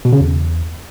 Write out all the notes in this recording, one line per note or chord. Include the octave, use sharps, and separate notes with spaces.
B2
C#3
E2